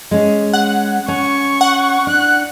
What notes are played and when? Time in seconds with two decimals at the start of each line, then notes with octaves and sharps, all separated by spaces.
0.11 G#3 C#4
0.53 F#5
1.08 C#4 C#6
1.61 F#5
2.07 D4 F#6